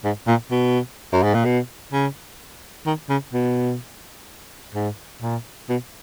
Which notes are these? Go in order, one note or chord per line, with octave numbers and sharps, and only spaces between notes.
G#2
A#2
B2
F#2
G#2
A#2
B2
C#3
D#3
C#3
B2
G#2
A#2
B2